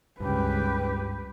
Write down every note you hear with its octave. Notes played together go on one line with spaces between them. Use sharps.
C#2 G2 G4 B4